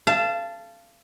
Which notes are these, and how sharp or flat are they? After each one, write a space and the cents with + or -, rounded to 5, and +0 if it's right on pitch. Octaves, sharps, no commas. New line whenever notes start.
F5 -30 A5 +0